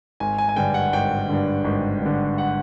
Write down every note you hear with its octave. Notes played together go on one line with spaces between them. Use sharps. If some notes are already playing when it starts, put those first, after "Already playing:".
G#1 G#5
G#5
G#5
G2 D3 G5
F#5
G#1 G5
G2 D3
G#1
G2 D3
F#5